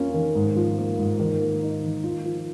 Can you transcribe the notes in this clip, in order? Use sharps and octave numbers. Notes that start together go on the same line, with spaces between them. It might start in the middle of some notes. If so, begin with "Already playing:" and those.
Already playing: F2 A#3 C#4 F4
D#3
G#2
F3
A#3
G#2
D#3
A#3
D#4
D#3
F4
F3